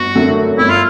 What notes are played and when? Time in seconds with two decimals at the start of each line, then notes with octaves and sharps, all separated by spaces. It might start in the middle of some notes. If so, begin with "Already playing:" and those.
Already playing: G1 F#4
0.15 F#2 D3 F#3 A3
0.58 G1 E4
0.70 F4